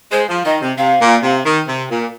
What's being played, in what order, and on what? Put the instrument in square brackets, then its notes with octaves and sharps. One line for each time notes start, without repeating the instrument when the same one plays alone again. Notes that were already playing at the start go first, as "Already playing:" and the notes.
[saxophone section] G#3 [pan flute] C5
[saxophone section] F3
[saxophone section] D#3 [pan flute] D#5
[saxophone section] C3
[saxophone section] C3 [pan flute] F5
[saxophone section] A#2
C3
D#3
C3
A#2